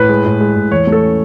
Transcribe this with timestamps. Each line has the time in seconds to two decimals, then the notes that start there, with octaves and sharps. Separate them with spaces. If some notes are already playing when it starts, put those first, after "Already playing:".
Already playing: A2 B4
0.09 G#3
0.25 A2
0.41 G#3
0.56 A2
0.72 E2 C#5
0.87 A3
0.92 A4
1.03 C#4